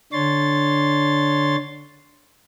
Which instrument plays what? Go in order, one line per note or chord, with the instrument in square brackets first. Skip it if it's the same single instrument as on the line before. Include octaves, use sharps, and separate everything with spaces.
[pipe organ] D3 D4 C#5 C6 A6